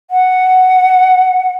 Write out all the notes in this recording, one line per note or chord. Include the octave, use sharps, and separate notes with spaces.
F#5